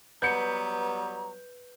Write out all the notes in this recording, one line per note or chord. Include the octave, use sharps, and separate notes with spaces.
F#3 G3 B3 B4 A#5 G6 C#7